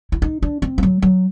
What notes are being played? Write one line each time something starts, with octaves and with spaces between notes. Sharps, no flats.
E4
D#4
D4
C4
F3
F#3
F#3